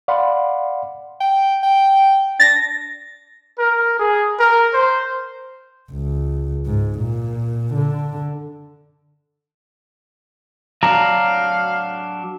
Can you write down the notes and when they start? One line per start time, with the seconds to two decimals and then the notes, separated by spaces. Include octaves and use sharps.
0.08 D5 F5 F#5 B5 C6
1.21 G5
1.63 G5
2.40 D4 A6 A#6
3.59 A#4
3.99 G#4
4.39 A#4
4.74 C5
5.91 C#2
6.66 G#2
6.98 A#2
7.74 D3
10.83 F#3 D4 F5 A#5